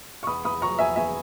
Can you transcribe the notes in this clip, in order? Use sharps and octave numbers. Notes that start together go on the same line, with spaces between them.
C#6
E2 B5 D#6
E2 B5 D#6
F#3 A#5 C#6
E2 E5 G#5
E2 E5 G#5